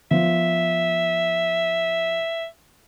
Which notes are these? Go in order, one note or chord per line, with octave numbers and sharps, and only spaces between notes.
F3 B3 E5